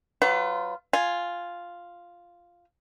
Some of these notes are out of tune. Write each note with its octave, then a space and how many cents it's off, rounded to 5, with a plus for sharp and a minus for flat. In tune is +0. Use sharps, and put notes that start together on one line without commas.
F#3 +25 F4 +0 B4 +40
F4 +0 G#5 +0